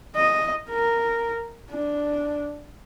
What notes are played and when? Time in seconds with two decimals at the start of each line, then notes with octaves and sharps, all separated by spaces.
0.16 D#5
0.70 A#4
1.70 D4